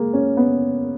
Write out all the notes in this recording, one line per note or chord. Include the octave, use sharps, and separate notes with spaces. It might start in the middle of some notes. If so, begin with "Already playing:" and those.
Already playing: G#3 A#3
C#4
B3